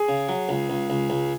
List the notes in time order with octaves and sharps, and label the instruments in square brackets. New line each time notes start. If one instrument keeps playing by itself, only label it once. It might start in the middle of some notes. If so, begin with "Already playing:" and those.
Already playing: [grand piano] G#4
[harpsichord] C#3
F#3
C#2
C#2
C#2
C#2